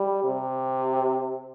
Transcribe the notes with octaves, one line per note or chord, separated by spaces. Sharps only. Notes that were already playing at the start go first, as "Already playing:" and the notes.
Already playing: G3
C3